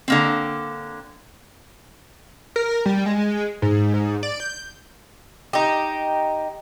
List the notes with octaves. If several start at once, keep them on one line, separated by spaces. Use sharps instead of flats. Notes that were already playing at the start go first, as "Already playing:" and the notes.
D3 A#3 C4
A#4
G3
G#3
G#2
G#2
D5
G6
D#4 G4